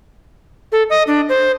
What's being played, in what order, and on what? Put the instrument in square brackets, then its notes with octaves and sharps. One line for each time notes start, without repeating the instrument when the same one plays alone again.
[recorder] A4
D#5
D4
C5